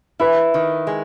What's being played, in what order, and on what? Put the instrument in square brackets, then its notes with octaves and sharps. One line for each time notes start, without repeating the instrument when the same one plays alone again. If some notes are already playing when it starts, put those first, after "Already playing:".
[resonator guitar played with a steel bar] E4 [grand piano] B4
[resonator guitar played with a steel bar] D#3
G#3